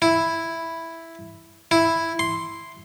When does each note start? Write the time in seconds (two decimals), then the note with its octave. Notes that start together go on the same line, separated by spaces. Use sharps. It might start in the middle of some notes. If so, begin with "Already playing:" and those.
0.02 E4
1.71 E4
2.19 C6